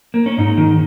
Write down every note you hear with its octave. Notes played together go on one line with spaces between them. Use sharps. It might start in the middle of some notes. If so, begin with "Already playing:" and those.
A#3
C#4
G#2 D#4
D#3